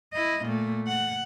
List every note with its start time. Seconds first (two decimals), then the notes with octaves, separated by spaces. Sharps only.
0.13 E4 D#5
0.45 A#2 A3
0.88 F#5